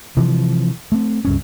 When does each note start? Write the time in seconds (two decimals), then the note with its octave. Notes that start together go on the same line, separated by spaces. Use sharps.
0.17 C3 E3 F3
0.92 A3 C4
1.25 C#2 G2 C#4